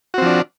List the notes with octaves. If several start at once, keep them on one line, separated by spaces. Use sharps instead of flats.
F3 C4 D4 F#4